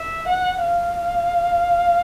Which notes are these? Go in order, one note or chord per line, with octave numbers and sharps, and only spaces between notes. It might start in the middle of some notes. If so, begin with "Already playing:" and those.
Already playing: E5
F#5
F5